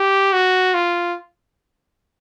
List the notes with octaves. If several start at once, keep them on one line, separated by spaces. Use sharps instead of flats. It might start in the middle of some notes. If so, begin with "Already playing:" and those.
Already playing: G4
F#4
F4